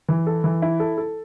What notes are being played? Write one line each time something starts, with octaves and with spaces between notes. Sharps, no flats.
E3
A4
E3
E4
A4
A4